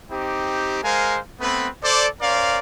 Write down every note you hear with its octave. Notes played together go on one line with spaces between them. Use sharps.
C4 D#4 G4
G#3 A#4 C5 F5 G#5
A3 B3 C4 B4
A4 C5 D5
C#4 A#4 C5 D5 F5